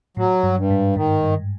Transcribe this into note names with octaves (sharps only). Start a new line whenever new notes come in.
A2 F#3
G2
G2
G#2
G#2 D#3
G2